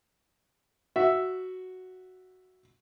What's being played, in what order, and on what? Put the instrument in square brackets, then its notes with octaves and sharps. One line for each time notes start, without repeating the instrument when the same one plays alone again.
[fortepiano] F#4 E5